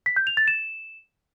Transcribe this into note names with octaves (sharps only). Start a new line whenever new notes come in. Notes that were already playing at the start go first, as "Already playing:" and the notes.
B6
G6
F7
A6
E7